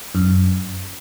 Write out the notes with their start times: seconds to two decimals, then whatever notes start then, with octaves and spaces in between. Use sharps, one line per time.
0.15 F#2